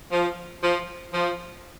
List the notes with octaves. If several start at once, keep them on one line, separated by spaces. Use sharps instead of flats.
F3
F3
F3